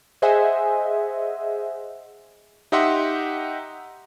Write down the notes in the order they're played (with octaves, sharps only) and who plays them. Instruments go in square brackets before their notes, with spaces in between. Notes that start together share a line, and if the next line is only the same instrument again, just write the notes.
[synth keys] G#4 C5 D#5 E5 F#5 G#5
[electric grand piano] D#4 G4 D#5 E5 F#5 C6